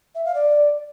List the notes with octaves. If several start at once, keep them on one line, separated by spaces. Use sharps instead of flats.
E5
F5
D5